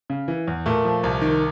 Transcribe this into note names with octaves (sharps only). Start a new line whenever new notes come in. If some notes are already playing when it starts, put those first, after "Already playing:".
C#3
E3
E2
A#2 A3
F3
C2
D#3